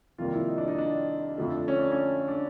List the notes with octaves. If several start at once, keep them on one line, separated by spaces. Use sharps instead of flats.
F2 C3 D#3 G3 A#3 F4
E4
D#4
D4
D#4
D4
F2 D3 F3 A3
C#4
D4
C#4
D4